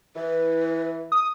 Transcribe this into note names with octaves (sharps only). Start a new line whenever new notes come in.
E3 B4
D#6